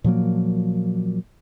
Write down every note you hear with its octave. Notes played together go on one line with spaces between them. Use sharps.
A#2 F3 F#3 A#3